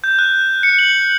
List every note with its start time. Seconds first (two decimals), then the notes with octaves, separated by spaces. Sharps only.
0.04 G6
0.19 F#6
0.63 C#7
0.79 F#7